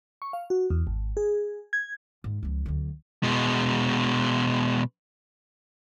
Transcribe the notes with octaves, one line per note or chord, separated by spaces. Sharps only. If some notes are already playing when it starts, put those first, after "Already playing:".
C#6
F5
F#4
E2
G#1
G#4
G#6
G#2
C#2 F3
D2 F#3
B2 G#3